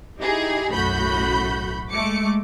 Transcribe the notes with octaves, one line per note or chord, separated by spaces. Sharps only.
D#4 E4 G4 G#4
B1 F#2 A2 F#4 B5 G6
G#3 A3 D6 C#7